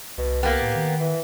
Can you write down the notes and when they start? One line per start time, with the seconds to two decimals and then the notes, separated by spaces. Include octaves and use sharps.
0.18 C2 B2
0.43 A#3 B3 G4
0.62 A2
0.76 D#3
1.00 E3